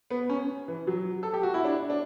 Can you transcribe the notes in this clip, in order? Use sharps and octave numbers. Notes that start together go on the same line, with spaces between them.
B3
C#4
E3
F#3
A4
G4
F#4
E4
D4
D4